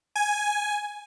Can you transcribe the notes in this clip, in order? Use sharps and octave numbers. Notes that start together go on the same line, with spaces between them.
G#5